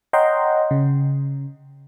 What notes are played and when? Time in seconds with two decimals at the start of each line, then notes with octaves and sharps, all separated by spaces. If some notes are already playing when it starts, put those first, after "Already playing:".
0.13 C#5 D#5 F#5 G5 A#5 C6
0.71 C#3